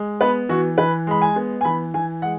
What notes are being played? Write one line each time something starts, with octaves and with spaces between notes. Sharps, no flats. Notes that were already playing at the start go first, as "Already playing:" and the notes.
Already playing: G#3
B3 B4
E3 F#4
E3 B4
G#3 B5
G#5
B3
G#5
E3 B5
E3 G#5
G#3 F#5